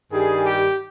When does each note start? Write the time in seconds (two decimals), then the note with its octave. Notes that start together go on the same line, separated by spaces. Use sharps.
0.11 G2 D#3 G3 G#4
0.45 G4